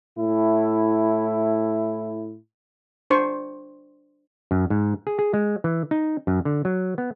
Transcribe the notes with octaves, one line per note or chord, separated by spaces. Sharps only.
A2 E4
D4 C5 C#6
F#2
G#2
G#4
G#4
G#3
E3
D#4
F#2
D3
F#3
B3